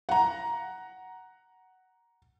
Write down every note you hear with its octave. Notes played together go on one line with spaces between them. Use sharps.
F#5 A#5